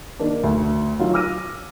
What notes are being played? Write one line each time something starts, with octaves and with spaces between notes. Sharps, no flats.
D#3 A#3 D4
D2
D#3 F#3 F4
D6 E6 F6 A#6 D#7